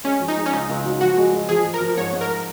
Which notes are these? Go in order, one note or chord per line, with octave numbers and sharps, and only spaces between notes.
G#3 C#4
F3
D#4
G#3
C#4
C#2 D#4
C#2
F#3
F3 F#4
G#3
G#3
F3 G#4
F3
A#4
F3
G#2 C#5
G#2
A#4